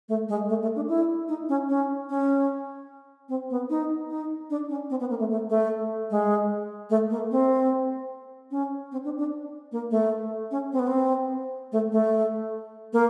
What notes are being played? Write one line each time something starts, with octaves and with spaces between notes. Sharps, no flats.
A3
G#3
A3
A3
D4
E4
D#4
C#4
C#4
C#4
C4
B3
D#4
D#4
D4
C#4
C4
B3
A#3
A3
A3
A3
G#3
A3
A#3
C4
C#4
C4
D4
D4
A#3
A3
C#4
C4
B3
C4
A3
A3
A#3